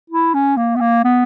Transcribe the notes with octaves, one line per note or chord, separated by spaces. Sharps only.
E4
C#4
A#3
B3
A#3
B3